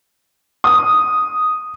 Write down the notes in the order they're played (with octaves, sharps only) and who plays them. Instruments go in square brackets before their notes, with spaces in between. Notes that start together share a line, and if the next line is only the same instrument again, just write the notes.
[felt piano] D#6